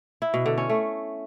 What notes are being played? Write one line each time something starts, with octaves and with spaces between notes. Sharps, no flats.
E4
B2
D3
C#4
A3